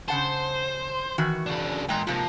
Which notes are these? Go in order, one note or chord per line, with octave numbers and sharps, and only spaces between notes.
C#3 C5 F#5 A5
D#3 E3 F#4
C#3 D4
E2 A#2 G#3 G5 A#5
G#2 C3 F3 A#3